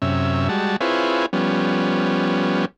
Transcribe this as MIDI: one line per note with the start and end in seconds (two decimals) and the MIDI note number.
0.02 0.48 42
0.02 0.48 48
0.02 0.48 61
0.02 0.48 76
0.49 0.76 55
0.49 0.76 56
0.49 0.76 66
0.49 0.76 81
0.81 1.26 60
0.81 1.26 64
0.81 1.26 65
0.81 1.26 68
0.81 1.26 71
0.81 1.26 73
1.33 2.65 53
1.33 2.65 55
1.33 2.65 59
1.33 2.65 61